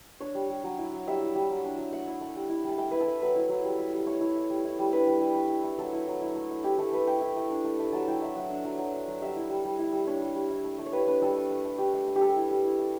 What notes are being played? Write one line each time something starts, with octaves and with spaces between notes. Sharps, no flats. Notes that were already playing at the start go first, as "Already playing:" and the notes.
D4 C#5
G3
G3
F#3
E4
F#3
G3 E5
E4
G3
F#3
D4
F#3
A3 F#5
E4
A3
G3
E4
G3 A5
A3 G5
E4 B4
A4
A3
F#3 B4
E4
F#3
G3
E4
G3
A3 C#5
E4
A3
G3
E4
G3
D4 B4
G3
G3
A3
E4
A3
F#3 A4
E4
F#3
E4
A3
A3
E4 G4
A3 A4
A3 B4
A3 G5
E4
A3
D4
A3
A3
F#3 A5
E4 G5
F#3 E5
F#3 F#5
D4
F#3
F#3
D4
F#3
G3 E5
E4
G3
G3
E4
G3
D4 C#5
G3
G3
E4
A3
A3
C#5
G3 B4
D4 B4
G3 A4
D4
A3
A3
D4 G4
A3
A3
G4
G3 A4
E4
G3
E4
A3